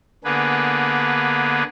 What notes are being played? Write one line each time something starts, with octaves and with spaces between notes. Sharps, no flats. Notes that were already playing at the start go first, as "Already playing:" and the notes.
D3 A#3 B3 G#4 B4